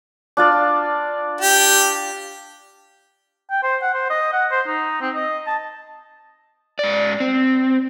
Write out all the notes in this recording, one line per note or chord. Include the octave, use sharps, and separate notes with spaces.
D4 F4 D5
G4
G5
C5
F#5
C5
D#5
F#5
C5
D#4
C4
D#5
A5
G#2 D5
C4